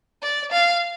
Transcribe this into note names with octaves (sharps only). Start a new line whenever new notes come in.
D5
F5